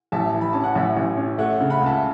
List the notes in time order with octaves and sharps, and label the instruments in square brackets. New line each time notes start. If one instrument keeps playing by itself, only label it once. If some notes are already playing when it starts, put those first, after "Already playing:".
[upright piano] A1 [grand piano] E5 A5
[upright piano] E3
[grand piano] B5
[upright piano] C#4 [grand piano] A5
[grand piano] F#5
[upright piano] A1 [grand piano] E5
[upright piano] A1
C#4
[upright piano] A3 [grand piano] C#5 F#5
[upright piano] C#3
[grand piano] F#5 B5
[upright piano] C#2 [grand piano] E5 A5